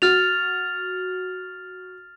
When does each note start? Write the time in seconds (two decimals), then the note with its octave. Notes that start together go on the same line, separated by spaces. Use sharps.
0.02 F#4 F6 A6 F7